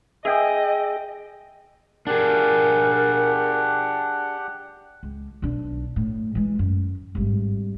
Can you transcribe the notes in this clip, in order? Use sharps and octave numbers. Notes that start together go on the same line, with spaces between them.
G#4 D#5 E5 G5
D4 G4 G#4 A#4 F#5
C#2
B1 D4
A2
E3 G#3
F#2
G#1 G2